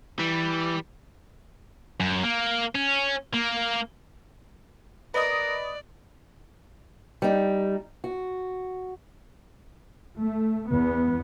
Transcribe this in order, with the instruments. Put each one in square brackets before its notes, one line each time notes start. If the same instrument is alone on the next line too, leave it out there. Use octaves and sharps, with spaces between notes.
[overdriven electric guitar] E3 [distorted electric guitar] G3
[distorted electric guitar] F#2
A#3
C#4
A#3
[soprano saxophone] A#4 [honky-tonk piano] B4 D#5 D#6 [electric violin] D5
[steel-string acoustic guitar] G3 D#4
F#4
[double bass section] A3
E2 B3